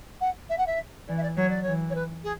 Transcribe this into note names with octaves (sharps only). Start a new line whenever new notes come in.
F#5
E5
F#5
E5
E3 D5
E5
D5
F#3 C#5
D5
E3 C#5
C#5
B4
G#4